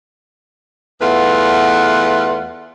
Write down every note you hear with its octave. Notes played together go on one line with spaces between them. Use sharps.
E2 A3 F4 B4 F#5